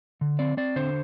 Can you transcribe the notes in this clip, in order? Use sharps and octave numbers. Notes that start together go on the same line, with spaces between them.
D3
C4 D5
C4 D5
D3 C5